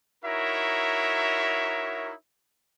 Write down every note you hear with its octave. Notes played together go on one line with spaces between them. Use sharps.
D#4 E4 F#4 A#4 C#5 E5